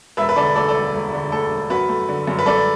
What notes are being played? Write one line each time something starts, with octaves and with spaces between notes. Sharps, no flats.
E1 B4 E5
B4
D3 A4 D5
D2 A4 D5
A4 D5
E1
E1
D3
D2 A4
E1
F#2 F#4 B4
A3
D3
F#2
B4
F#2 A4 D5